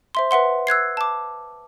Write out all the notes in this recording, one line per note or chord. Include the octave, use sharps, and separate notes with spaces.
C5 E5 C6
B4 E5 F#5 C6
E6 F#6 G#6 C7
A5 D6